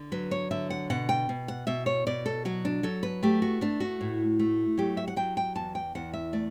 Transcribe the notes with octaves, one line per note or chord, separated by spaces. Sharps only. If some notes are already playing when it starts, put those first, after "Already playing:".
Already playing: D3
F#3 B4
C#5
D3 E5
F#5
B2 F#5
G5
B2
F#5
B2 E5
C#5
B2 D5
A4
F#3 F#4
D4
F#3 A4
B4
A3 G4
F#4
A3 D4
F#4
A2
A3
F#3 G4
E5
F#5
F#3 G5
G5
E2 A5
G5
E2 F#5
E5
A3 D5